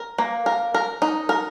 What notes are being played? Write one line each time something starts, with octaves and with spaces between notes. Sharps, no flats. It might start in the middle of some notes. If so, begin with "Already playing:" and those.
Already playing: A#4
A#3
A#4
A#4
D#4
A#4